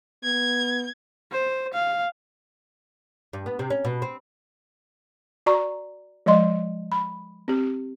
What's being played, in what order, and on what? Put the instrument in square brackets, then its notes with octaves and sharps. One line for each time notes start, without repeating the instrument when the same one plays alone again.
[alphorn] B3 [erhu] G#6
[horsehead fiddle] C5
F5
[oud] G2
B3
C3
C#4
B2
C4
[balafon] F#4 D5 A#5 C#6
F3 G#3 D5 D#5 C6
B5
C4 G4